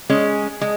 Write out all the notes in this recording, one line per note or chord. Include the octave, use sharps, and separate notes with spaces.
G#3 C#4
G#3